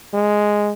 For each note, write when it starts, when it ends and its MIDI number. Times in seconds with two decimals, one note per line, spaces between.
0.14 0.73 56